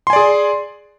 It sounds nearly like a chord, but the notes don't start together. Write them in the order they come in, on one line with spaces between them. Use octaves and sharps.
C6 G#5 D5 G#4